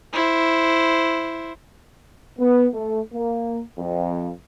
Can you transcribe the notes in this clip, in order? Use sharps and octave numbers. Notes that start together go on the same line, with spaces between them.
E4 C5
B3
A3
A#3
F2